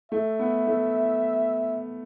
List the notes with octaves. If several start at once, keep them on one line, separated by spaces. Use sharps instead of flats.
A3 E5
B3
A3